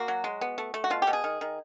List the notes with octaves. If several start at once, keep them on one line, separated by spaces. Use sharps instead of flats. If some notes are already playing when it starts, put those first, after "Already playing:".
Already playing: A#3 F#4
F#3
G#3
B3
A3
A3
F#4
B2 F4
G4
B2
G#4
D#3
D#3